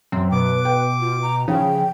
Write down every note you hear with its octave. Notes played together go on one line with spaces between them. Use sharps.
F#2 C4
B2 B4 D6
G5
F4
A#5
C#3 F3 G5